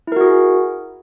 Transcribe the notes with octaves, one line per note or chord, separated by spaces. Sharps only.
E4 F#4 G#4 A#4